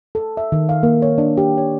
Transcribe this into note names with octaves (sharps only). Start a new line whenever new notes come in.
A4
E5
D#3
F5
A#3
C#5
D4
G4
C#5